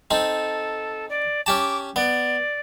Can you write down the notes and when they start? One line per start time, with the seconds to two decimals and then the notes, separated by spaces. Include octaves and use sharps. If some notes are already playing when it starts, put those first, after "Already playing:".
0.11 C4 D#4 A4
1.10 D5
1.46 C#4 G4 A5 D6
1.96 B3 D5